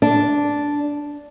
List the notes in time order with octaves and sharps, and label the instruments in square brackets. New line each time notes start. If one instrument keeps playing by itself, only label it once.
[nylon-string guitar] D4